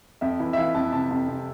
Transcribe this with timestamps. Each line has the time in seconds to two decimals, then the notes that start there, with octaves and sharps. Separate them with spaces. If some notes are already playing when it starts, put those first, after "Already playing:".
0.21 F2 E5
0.40 E3
0.53 E5
0.57 E3 F5
0.75 F2 A5
0.93 C3 A5
1.11 F2
1.28 C3